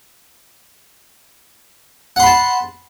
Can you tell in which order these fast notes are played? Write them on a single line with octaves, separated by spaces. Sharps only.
F#5 C6 B5 A5